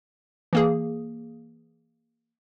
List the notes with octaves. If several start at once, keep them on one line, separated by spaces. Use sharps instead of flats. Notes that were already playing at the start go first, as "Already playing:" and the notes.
E3 A#3 G#4